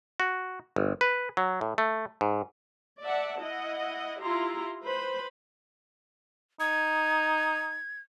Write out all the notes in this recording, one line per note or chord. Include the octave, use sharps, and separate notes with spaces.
F#4
G1
B4
F#3
A2
A3
G#2
D5 E5 F#5 A5
E4 D#5 F#5
E4 F4 G4 A#5 C6
B4 C5 B5
D#4 G#6